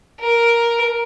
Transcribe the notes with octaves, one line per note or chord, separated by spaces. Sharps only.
A#4